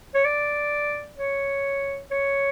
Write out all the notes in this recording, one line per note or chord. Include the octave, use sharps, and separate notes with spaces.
C#5
D5
C#5
C#5